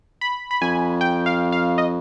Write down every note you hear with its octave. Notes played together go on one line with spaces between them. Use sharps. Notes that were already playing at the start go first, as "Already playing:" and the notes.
B5
B5
F2 G#5
G5
F5
F5
D#5